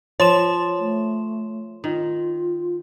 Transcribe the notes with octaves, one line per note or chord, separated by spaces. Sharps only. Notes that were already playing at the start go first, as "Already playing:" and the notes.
F3 C#5 C6 E7
A3
D#3 F4